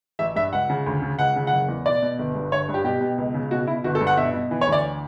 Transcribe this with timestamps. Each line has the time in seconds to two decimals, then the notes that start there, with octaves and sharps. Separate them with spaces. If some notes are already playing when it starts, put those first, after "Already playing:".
0.19 A1 E5
0.36 G2 E5
0.53 C#2 F#5
0.70 C#3
0.86 D2
1.02 C#3
1.19 C#2 F#5
1.36 C#3
1.47 F#5
1.53 F#1
1.69 E2
1.86 B2 D5
2.02 B2
2.19 G1
2.35 G2
2.52 G1 C#5
2.69 G2
2.74 G4
2.84 B2 G4
3.01 B2
3.18 C#2
3.34 C#3
3.51 B2 F#4
3.67 B2 E4
3.84 G1 F#4
3.95 A4
4.01 G2
4.07 F#5
4.17 B2 E5
4.33 B2
4.51 E3
4.61 C#5
4.67 D2
4.72 D5